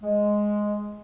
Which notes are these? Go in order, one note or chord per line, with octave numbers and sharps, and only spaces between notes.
G#3